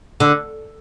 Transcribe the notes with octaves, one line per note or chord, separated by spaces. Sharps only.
D3